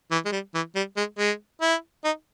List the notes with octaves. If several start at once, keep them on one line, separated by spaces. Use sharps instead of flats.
E3
G#3
G3
E3
G3
G#3
G#3
E4
D#4